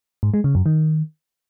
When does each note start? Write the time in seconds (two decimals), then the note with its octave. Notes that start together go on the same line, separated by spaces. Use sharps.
0.23 G#2
0.34 G#3
0.44 C#3
0.55 F#2
0.66 D#3